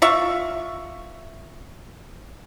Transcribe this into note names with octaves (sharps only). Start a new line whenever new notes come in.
F4 E5 C#6